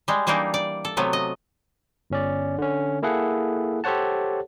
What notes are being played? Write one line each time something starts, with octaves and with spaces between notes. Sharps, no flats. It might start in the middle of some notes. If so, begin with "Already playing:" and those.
G3 G#3
E3 G3 A#3 D4 D#4
D5
A4
C3 F#3 A3 B3
D#5
G1 C#4 D5
D3 C#4
A#3 E4 G#4 A4 F#5
G4 A4 C5 C#5 F#5 A5